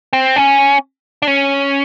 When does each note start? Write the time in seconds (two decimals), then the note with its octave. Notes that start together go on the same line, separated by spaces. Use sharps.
0.13 C4
0.36 C#4
1.22 D4
1.27 C#4